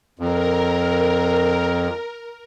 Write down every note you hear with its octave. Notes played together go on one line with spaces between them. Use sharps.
F2 A#4